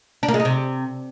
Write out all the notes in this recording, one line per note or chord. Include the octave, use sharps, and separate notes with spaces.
D4
A#3
G#3
D#4
C3